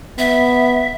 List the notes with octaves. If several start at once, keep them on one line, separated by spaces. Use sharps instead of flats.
B3 E5